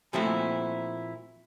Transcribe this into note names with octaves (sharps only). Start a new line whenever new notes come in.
A#2 F3 A3 C4 E4 F#4